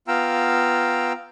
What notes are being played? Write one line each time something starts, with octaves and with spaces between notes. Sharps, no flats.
B3 F4 F5 G5 A#5 E6